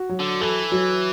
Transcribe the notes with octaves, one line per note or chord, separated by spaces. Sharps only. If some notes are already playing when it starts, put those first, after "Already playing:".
Already playing: F#4
F#3
D3
E3 A4
F#3